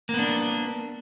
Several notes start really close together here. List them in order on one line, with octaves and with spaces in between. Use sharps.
A#3 B3 D4